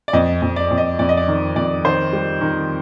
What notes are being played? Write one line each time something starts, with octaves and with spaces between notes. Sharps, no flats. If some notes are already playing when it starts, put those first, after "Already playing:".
D5
F2 D#5
F2
D5
F2
D#5
F2 D5
D#5
D5
D#3
F2 D5
D#3 C5
G3
D#3